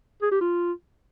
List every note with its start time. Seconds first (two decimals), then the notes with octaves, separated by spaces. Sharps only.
0.22 G#4
0.32 G4
0.41 F4